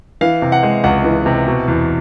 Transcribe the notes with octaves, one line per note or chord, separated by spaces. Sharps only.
E3 F5
C3
F#5
G#3
C#2 F#5
E3
C3
B2
E2